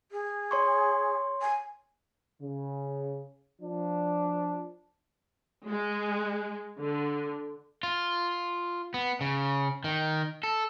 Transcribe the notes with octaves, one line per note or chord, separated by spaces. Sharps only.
G#4
C#5 C6 C#6
G#5
C#3
F3 D4
G#3
D3
F4
B3
C#3
D#3
A4